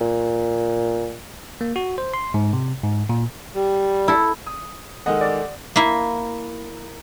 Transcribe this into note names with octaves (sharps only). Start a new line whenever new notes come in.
A#2
A#3
F#4
C5
C6
G#2
C3
G#2
A#2
G3
E4 A4
D#6
D#3 G#3 A4 D#5 F#5
D5
A#3 E4